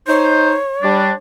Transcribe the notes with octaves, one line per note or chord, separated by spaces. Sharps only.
D#4 C5 C#5
G3 D4